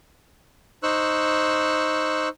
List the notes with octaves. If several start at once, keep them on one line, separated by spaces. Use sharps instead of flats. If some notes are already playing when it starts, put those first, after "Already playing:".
D#4 C5 C#6 E6 F#6